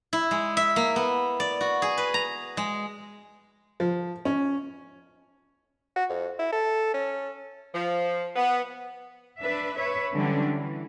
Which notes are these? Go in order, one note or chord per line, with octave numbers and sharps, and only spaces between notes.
E4
G#3
E5
A#3
B3
D5
F#4
G#4
B4
A#5
G#3
F3
C#4
F#4
F2
E4
A4
C#4
F3
B3
D4 B4 E5
B4 C#5 E5
D3 E3 F#3 G3 C#4 D4
E3